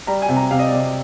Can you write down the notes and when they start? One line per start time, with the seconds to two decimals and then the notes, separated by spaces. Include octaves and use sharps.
0.07 G3 A#5
0.22 G#5
0.29 C3
0.36 A#5
0.51 C3 F5
0.59 D#5
0.67 D5
0.73 C3 D#5